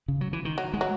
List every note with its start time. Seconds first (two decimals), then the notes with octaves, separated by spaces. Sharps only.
0.08 C#3
0.21 F#3
0.33 E3
0.45 D#3
0.58 F#3
0.74 G#3
0.81 F#3